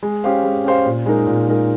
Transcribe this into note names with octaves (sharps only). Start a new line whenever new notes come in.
G#3
C#4 G4 C5 F5
G#3
C#4 G4 C5 F5
A#2
G#3 D#4 A#4
A#2
G#3 D#4 A#4